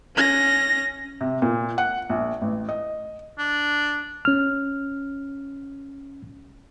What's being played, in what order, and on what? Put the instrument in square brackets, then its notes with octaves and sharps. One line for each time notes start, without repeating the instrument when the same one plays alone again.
[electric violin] C#4 A#6
[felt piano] C3
A#2
F#5
A#1
A1
D#5
[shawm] D4
[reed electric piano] C#4 F6